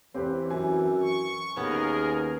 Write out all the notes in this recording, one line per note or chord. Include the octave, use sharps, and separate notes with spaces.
E3 C4 G4 B4
F#2 G#5
C#6
D#2 B3 C#4 G#4 A#4